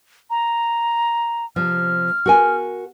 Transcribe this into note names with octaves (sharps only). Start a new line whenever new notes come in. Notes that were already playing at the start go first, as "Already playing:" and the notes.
A#5
C3 F3 F6
F#4 A#4 G#5